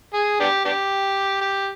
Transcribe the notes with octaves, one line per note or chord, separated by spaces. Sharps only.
G#4
B3 D4 G4
B3 D4 G4
G4